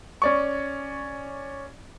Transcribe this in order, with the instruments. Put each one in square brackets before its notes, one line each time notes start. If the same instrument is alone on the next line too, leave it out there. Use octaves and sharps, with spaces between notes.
[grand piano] C#4 D5 C#6